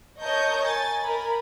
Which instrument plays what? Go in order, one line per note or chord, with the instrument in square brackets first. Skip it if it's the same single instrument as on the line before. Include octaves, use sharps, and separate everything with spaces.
[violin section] A#4 C#5 D#5 A5 C#6 G6
G#5 A6
A#4 B5